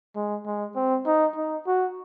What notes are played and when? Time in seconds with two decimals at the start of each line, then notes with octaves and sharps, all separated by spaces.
0.16 G#3
0.46 G#3
0.76 C4
1.06 D#4
1.36 D#4
1.67 F#4